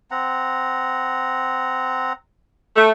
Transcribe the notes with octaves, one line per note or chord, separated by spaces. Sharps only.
C4 F#5 A#5
A3